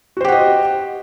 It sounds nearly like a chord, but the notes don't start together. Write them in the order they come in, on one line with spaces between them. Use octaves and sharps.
F#4 C5 G4 F#5 D#5